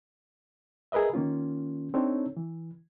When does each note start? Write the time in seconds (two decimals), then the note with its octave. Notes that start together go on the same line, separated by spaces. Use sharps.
0.92 G#4 A#4 B4 D#5 E5
1.13 D#3 A#3 C#4 F4
1.94 C4 D4 D#4 A4 C#5
2.37 E3